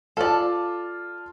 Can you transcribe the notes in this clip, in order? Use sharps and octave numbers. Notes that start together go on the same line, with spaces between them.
F4 A4 D5 A5